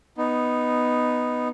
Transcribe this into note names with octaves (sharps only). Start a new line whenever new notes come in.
B3 D#4